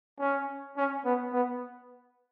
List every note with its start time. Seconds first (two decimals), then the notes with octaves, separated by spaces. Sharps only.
0.19 C#4
0.77 C#4
1.05 B3
1.33 B3